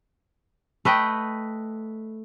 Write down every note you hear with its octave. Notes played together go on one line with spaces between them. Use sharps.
A3 B4 D#5 G5